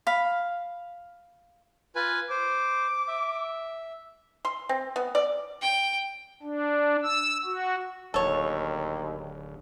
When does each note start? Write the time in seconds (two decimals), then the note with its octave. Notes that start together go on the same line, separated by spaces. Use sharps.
0.07 F5 B5
1.95 F4 B4 G#5
2.30 C5 D6
3.08 E5
4.45 C6
4.69 C4
4.96 B3
5.15 D5
5.61 G5
6.42 D4
7.03 E6
7.45 F#4
8.14 D1 D#2 A4 C#5